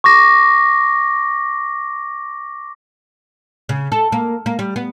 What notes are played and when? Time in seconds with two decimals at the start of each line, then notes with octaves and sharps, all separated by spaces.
0.04 C#6 D6 A#6
3.69 C#3
3.92 A4
4.12 A#3
4.46 A#3
4.59 G3
4.76 B3